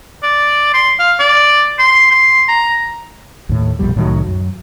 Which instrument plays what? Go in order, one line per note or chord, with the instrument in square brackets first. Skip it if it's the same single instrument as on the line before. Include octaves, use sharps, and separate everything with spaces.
[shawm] D5
C6
F5
D5
C6
C6
A#5
[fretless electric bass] D#2 A2
A#1 F2 B2 G3
C2 A2 D#3 F#3
F#2